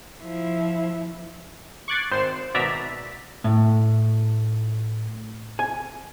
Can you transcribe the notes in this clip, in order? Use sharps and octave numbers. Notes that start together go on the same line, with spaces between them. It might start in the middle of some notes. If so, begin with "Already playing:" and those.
F3 E4
C#6 D6 F#6 G#6 A6 C7
G#1 C5 C7 E7
G#1 B2 D5 E5 A#5 B6
A2
G#5